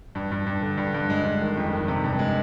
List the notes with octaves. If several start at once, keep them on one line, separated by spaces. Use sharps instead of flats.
G2
G2
G2
D3
G2
G2
G#3
G2
D#3
F2
D#3
C3
G2
G#3